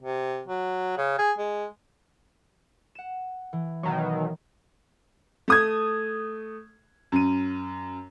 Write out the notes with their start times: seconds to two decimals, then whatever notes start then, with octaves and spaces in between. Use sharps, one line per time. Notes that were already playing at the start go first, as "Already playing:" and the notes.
0.02 C3
0.47 F#3
0.97 C#3
1.18 G#4
1.38 G#3
2.95 F#5 E7
3.53 E3
3.83 B2 D#3 F#3
5.48 A3 D#6 G#6
7.12 F#2 D#7